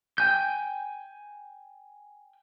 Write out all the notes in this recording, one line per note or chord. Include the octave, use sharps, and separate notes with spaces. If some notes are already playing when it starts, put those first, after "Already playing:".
G5 G#5 G6